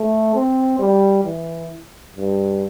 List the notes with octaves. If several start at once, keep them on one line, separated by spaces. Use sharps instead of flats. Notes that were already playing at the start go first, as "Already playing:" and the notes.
Already playing: A3
C4
G3
E3
G2